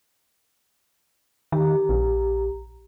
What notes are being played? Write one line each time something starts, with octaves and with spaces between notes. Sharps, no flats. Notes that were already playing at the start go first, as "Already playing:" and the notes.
D#3 G4 A#5
A#1